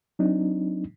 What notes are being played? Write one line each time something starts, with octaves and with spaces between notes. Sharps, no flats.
F#3 C4 D4 D#4